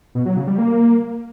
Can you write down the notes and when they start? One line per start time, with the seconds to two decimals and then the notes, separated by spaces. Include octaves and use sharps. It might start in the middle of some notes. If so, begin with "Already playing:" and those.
0.15 B2
0.26 F#3
0.37 C#3
0.47 G3
0.58 A#3